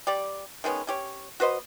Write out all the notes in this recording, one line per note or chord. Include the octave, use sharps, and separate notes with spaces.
G3 G4 D5
D#3 G#3 B3 C#4
C#4 G4 C#5
F#4 B4 C5 D#5